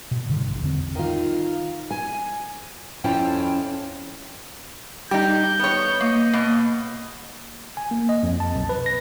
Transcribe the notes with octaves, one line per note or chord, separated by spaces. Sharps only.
B2
G2 B2 D3 D#3
A1
E2 D3 C4
D#3 F4
G#5
F2 C#4 E4 F4 G5 A5
G3 D#4 G4 G6
B3 C#5
A#3 D#5
B2 A#3
G#5
A#3
D#5
F2
A5
B1
B4
A#6